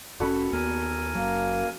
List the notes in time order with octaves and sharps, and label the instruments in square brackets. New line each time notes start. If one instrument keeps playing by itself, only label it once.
[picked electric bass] F1 B2 C#4 [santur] F#4 A4 B5
[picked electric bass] D#2 B3 [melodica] A#4 G#5
[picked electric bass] F#1 C#2 F#3 [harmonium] A#3